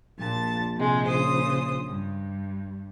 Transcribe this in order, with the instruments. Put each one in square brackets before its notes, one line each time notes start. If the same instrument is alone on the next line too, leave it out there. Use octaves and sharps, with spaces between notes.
[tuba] A#1 [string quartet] A#2 A5
[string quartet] C3 G#3
C#3 C5 D#6
G2